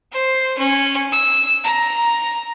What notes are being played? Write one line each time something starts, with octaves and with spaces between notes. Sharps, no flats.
C5
C#4
E6
A#5